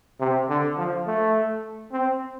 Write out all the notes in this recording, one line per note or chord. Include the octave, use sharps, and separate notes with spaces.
C3
D3
F3
A3
C4